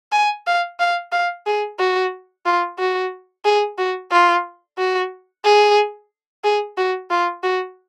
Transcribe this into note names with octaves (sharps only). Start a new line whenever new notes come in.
G#5
F5
F5
F5
G#4
F#4
F4
F#4
G#4
F#4
F4
F#4
G#4
G#4
F#4
F4
F#4